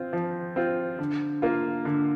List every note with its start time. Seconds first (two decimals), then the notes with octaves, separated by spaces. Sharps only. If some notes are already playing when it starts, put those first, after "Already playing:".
Already playing: C4 F4
0.13 F3
0.56 C4 F4
0.99 D3
1.42 A#3 F4
1.85 D3